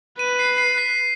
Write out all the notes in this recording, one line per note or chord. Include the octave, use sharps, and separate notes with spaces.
B4 D#7
C7
C7
B6